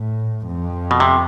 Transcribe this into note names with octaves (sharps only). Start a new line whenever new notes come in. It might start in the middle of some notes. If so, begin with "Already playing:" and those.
Already playing: A2
F2
B2
C3